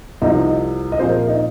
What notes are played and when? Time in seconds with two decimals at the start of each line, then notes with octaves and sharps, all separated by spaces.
0.22 C2 C3 F3 C4 D#4
0.92 D#5
0.99 A#2 F3 C4 C5
1.09 A#4
1.27 D#4